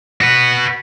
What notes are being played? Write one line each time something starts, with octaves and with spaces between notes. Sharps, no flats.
F#4 B4